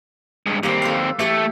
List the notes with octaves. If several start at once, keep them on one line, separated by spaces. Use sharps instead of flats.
G2 G#3
D#2 G3 A#3 C4 G4
A4 B4 F5
E3 A3 G4 A4